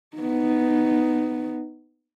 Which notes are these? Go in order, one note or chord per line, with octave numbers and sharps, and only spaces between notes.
B3 D#4